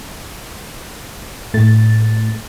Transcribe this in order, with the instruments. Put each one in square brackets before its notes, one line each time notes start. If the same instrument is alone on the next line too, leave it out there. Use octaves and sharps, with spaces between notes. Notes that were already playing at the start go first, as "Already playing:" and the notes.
[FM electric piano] A2 A3 A6